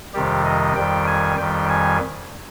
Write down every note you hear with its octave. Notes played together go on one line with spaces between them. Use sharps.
F2 C3 D#3 G3 G4
D#5
F2 D#3 G3 G5
G#5
F2 D#3 G3 G5
G#5